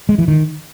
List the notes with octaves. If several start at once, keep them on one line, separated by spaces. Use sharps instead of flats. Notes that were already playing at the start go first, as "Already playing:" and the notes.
G#3
E3
D#3